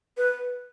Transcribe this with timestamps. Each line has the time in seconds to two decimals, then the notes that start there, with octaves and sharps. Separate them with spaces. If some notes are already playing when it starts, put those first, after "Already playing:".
0.17 B4